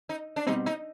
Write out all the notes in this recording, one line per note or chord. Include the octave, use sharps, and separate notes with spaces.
D#4
D4
B2 G3 C4 D#4
D#4